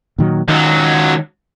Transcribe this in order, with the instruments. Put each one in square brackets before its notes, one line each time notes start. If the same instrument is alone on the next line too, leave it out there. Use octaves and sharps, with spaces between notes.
[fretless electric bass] A#2 D#3 F#3
[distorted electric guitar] C#2 F#3 [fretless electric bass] D#3